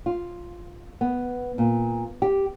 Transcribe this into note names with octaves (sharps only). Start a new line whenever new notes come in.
F4
B3
A#2
G4